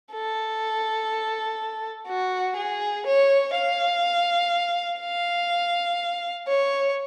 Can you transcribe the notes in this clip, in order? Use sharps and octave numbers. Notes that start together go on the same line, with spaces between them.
A4
F#4
G#4
C#5
F5
F5
C#5